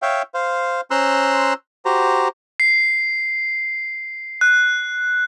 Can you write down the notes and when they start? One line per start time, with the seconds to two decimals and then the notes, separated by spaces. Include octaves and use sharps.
0.02 C#5 E5 F5 G5
0.34 C5 F5
0.91 C#4 C5 A#5 C6 E6 F#6
1.85 F#4 G4 C5 A#5
2.60 C7
4.41 F#6